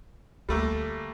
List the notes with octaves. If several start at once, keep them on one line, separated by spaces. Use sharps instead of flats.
D2 G3 A3 A#3